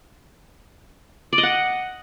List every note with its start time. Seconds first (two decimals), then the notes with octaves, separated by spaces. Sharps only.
1.33 D5
1.38 D#5
1.43 F#5